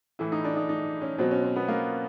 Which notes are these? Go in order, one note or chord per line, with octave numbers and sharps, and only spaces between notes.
A2 E3 E4
D#4
D4
D#4
D#4
C#4
B2 F#3 C4
C#4
C4
B3
A#3